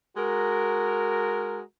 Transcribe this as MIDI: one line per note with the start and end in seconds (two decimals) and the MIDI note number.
0.17 1.61 56
0.17 1.61 66
0.17 1.61 70